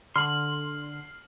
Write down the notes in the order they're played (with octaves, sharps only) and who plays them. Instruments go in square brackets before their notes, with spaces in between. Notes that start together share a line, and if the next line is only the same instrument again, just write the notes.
[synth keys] D3 [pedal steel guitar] C6 [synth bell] F6 F#7